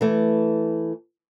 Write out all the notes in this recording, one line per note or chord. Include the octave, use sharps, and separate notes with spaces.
E3 A3